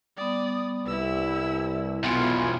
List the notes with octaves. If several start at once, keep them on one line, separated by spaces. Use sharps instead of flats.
G3 B3 D5 D#6
C2 E4 B4 E6
B1 E2 B2 F4 G#5 C6